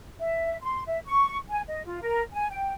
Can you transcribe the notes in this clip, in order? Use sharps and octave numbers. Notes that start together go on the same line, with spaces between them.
E5
C6
E5
C#6
G#5
D#5
F4
A#4
G#5
G5